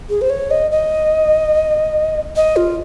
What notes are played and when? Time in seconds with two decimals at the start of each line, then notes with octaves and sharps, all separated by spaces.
0.10 G#4
0.21 C5
0.30 C#5
0.51 D#5
0.71 D#5
2.36 D#5
2.56 F4